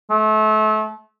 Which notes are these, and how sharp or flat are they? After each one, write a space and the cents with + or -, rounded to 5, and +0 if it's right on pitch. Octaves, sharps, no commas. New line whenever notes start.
A3 -30